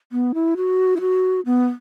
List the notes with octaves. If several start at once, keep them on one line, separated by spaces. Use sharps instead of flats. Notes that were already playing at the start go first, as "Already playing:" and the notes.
B3
E4
F#4
E4
F#4
B3